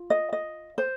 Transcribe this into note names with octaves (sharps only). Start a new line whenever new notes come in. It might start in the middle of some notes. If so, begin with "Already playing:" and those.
Already playing: F4
D#5
D#5
C5